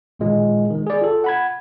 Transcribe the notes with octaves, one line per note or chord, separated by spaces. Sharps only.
A1 A#2 D#3 G#3 F4
D#3 G#3
G#4 D5
F4 A4
F#5 B5 G#6